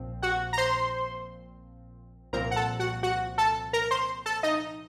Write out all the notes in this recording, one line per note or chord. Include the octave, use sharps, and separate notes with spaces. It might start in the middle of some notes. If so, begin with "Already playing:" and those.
Already playing: A#1 A#2 F3 C4
F#4 F#5
A#5
C5 C6
C2 A#2 F3 C4 A#4 A#5
F#5
A4 A5
F#4 F#5
F#4 F#5
A4 A5
A#4 A#5
C5 C6
A4 A5
D#4 D#5